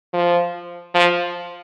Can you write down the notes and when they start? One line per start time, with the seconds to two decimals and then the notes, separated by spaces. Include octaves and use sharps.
0.13 F3
0.94 F3